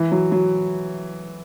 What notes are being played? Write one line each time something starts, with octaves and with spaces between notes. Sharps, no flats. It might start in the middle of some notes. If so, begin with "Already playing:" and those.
Already playing: E3
F#3
F#3